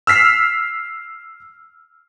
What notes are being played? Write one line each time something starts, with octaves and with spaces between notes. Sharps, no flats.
E6 F6 B6 C7